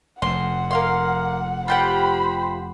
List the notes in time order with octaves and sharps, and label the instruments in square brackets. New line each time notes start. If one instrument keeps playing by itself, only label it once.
[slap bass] F1 F2 [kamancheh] F#5 [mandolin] C6
[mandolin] A#3 F5 C6
[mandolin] F4 G4 F#5 [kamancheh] C5 B5